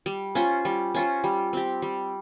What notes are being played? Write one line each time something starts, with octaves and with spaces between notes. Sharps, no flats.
G3
C#4 F4 C5
G3
C#4 F4 C5
G3
C4 G4
G3